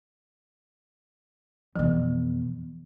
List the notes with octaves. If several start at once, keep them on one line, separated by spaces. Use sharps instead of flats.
F2 B2 E3